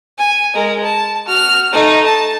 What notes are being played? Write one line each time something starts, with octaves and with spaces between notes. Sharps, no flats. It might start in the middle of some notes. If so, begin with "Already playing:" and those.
G#5
G#3 A#4
A5
F#4 F6
A3 D#4
A5